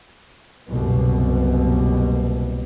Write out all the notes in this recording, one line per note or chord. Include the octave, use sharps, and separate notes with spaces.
F#1 C2 B2